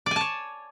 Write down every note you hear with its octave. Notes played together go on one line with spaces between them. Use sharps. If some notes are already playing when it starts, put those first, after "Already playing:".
C#5 D5 G#5 A5